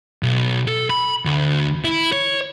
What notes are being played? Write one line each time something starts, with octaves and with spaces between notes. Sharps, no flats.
B1
A4
B5
D2
E4
C#5